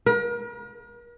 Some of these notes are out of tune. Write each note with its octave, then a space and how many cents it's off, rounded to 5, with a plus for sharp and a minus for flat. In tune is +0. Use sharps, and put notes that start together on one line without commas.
A#4 +40